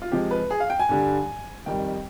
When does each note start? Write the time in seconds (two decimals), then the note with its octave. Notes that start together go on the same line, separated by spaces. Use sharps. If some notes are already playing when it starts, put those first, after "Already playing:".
0.02 F4
0.11 C3 F3 G#3 G4
0.31 B4
0.51 G#4
0.60 F5
0.70 G5
0.79 G#5
0.89 G2 D3 G3
1.66 F2 D#3 G3 G5